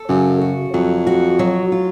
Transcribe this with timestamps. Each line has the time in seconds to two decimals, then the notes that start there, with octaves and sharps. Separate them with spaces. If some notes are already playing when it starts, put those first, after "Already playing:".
Already playing: A4
0.09 F#2 C#3
0.41 F#4
0.74 F2 F#3
1.07 F#4
1.39 F#3
1.72 F4